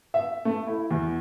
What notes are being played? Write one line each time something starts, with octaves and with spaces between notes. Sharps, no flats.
E5
A3
E4
E2